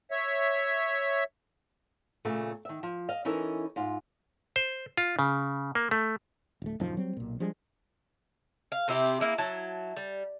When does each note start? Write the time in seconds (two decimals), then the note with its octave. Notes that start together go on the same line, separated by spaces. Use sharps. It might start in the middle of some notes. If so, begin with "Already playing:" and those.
0.11 C#5 E5
2.25 A#2 C#3 A3
2.65 D#3 E5
2.83 F3
3.09 D#5 F5
3.25 E3 C#4 D#4 E4 A4 A#4
3.76 G#2 F4
4.56 C5
4.97 F4
5.19 C#3
5.75 A#3
5.91 A3
6.62 D1 A3
6.80 D#1 F#2 D#3 F3
6.97 F#3 G3 C4
7.17 B1 A#2
7.40 F3 G3 G#3 D4
8.72 F5
8.88 C3 C4 E4 G4
9.20 A#3 E4 G#4
9.38 F#3 E4 A5
9.96 G3